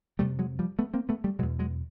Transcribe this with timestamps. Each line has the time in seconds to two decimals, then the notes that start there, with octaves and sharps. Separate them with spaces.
0.19 F2 C3 G3 A3
0.39 F#3 G#3
0.59 F3 G3
0.79 A3 B3
0.94 A#3 C4
1.09 A3 B3
1.24 G3 A3
1.39 B2 F#3 G#3
1.42 E2
1.59 F#3 G#3